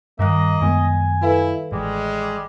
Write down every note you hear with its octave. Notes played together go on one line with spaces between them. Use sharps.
G2 D#3 G3 A#3 D#5 F#6
F#2 G#3 B3 G#5
E4 A4 B4 F5
A1 G3 G#3